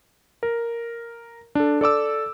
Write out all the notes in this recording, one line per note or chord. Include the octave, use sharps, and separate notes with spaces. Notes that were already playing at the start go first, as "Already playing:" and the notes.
A#4
D4 A4
A4 D5 D6 E6